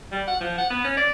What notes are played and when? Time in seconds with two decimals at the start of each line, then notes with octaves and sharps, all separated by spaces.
0.12 G3
0.28 F#5
0.41 F3
0.58 F#5
0.70 B3
0.85 C#4
0.97 D5